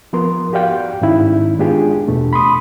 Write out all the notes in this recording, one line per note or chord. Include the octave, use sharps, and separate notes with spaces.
F3 B3 A#4 C6
F#4 G4 D5 F5 G5
G#2 D#3 C#4 D#4 E4
G#3 B3 D4 F4 G4 G#4
E2 B2 A3 D4
B5 C6 D#6